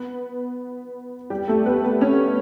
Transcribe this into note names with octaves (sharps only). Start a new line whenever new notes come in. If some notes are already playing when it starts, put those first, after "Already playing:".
Already playing: B3 B4
G3 G4
A3 A4
B3 B4
B3 B4
C#4 C#5